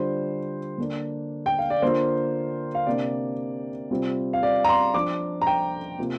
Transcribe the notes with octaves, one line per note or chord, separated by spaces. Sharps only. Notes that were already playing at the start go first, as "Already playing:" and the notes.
Already playing: D3 G3 D4 F4 C5
D3 A#3 D4
G5
F5
D5
D3 A#3 F4 C5
F5
C3 A#3 D4 D5
C3 G3 C4 F4
F5
D5
A#5
C6
F3 D4 F4 D6
A#5
G5
C3 A#3 F4